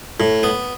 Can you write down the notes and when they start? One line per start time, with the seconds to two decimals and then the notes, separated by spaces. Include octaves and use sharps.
0.20 A2
0.43 B3